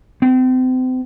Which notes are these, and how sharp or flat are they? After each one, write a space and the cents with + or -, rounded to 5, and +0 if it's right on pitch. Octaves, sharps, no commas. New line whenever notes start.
C4 -35